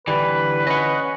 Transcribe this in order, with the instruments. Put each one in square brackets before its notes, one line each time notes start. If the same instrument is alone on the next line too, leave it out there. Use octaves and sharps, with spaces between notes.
[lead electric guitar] D3 E3 [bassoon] G3 [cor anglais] B4
[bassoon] C#4 [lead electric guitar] D#5 F#5